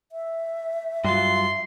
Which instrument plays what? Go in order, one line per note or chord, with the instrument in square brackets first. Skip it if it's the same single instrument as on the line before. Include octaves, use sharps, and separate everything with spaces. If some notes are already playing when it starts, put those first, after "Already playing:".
[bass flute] E5
[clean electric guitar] G2 F#3 F4 [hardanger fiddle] C6